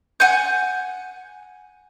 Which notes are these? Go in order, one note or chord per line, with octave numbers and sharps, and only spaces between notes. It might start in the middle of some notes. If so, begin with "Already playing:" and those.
F#5 G#5 G6